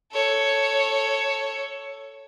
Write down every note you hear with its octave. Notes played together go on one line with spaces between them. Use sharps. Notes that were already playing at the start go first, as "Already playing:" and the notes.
A4 C#5